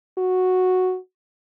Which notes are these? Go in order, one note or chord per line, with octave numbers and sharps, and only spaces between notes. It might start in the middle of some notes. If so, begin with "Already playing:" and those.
F#4